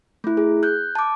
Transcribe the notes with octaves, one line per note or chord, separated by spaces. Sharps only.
A3 E4
G#4
F#6 G6
A5 D6